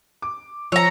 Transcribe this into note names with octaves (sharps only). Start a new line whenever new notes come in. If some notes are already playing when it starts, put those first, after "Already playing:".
D6
F3 C#5 A#5 E6